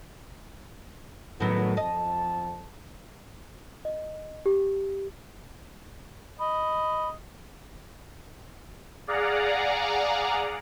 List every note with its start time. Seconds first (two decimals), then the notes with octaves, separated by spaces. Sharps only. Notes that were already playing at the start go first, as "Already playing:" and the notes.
1.40 F#1 F#2 A2 D#3 F#3 B3
1.77 F2 D#5 A5
3.85 D#5
4.46 G4
6.39 D#5 B5
9.07 G#4 D5 F5 F#5 A#5